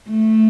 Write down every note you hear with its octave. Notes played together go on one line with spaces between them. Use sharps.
A3